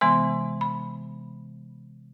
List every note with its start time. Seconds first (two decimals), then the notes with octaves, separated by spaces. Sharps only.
0.01 C3 E3 G#3 B3 C6
0.61 B5